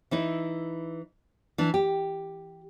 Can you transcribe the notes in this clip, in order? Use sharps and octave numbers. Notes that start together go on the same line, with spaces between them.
E3 D#4 E4
E3 D4
G4